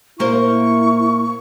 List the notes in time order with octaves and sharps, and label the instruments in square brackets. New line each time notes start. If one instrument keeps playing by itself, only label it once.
[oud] A#2 A#3 C5 [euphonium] E4 [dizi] C#6